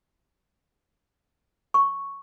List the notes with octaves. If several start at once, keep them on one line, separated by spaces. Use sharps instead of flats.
C#6